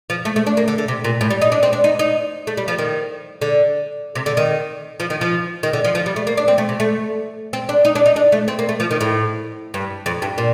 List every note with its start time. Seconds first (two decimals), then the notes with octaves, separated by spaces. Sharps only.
0.10 F3
0.25 A3
0.36 A3
0.47 D4
0.57 A#3
0.68 D3
0.78 D3
0.88 C3
1.04 A#2
1.21 A2
1.30 G3
1.42 D#4
1.52 D4
1.63 C4
1.73 D4
1.84 D#4
1.99 D#4
2.47 A3
2.57 G3
2.68 F3
2.78 D#3
3.42 D3
4.15 C3
4.26 D3
4.37 D#3
5.00 F3
5.10 D#3
5.21 F3
5.63 D#3
5.73 D3
5.84 F3
5.95 F3
6.06 G3
6.16 A3
6.27 A#3
6.37 D4
6.48 C4
6.58 A3
6.69 C3
6.80 A3
7.53 C4
7.69 D4
7.85 D#4
7.95 D4
8.06 D#4
8.16 D4
8.32 A3
8.48 C4
8.59 A#3
8.69 A3
8.80 F3
8.91 D#3
9.01 A2
9.74 G2
10.06 F2
10.22 G2
10.38 A#2